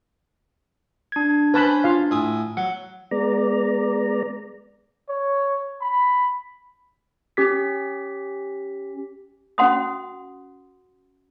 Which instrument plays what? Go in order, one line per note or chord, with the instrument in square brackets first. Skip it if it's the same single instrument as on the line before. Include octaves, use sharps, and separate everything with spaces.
[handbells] D4 G#6
[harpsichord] C#4 C5 [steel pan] B4 A5 B5
[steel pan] F4 F5
[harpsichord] A2 G#5 D#6
[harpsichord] F#3 [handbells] F#5
[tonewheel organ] G#3 B3 D5 A#5
[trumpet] C#5
B5
[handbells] C#4 G4 B6
[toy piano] C#4 F#4 F#5 C6 D#6